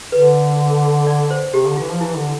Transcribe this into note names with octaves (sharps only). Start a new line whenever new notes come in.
D3 B4
D5
C5
C3 G4
D3
E3 F4
F3
E3 E4
D3